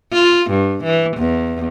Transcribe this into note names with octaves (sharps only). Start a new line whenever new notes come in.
F4
G2
E3
E2